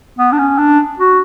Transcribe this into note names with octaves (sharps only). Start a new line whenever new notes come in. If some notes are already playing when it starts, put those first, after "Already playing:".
B3
D4
C#4
D4
F#4